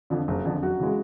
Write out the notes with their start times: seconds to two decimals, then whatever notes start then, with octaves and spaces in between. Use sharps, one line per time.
0.10 F2 D3 F3
0.28 F#1
0.45 F2 D3 F3
0.63 F#2 F#4
0.80 C#3 E3 G#3